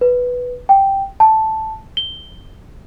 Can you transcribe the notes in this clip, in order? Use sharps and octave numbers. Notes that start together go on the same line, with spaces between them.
B4
G5
A5
G7